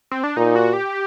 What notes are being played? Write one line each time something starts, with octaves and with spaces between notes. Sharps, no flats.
C4
D4
A#2 D#4
F#4
G4